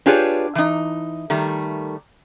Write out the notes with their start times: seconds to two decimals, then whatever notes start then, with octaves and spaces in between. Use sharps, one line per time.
0.06 D4 F4 G4 G#4 B4 C#5
0.55 E3 D#4
1.30 D#3 G3 A3